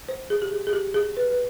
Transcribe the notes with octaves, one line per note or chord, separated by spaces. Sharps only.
C5
G#4
G4
G#4
G#4
G4
G#4
B4
B4